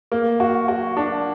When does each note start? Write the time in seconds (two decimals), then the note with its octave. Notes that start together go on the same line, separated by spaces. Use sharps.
0.12 A#3
0.40 F#4
0.68 F#4
0.97 D4